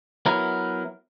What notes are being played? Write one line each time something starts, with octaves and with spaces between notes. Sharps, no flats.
F#3 B3 E4 A#4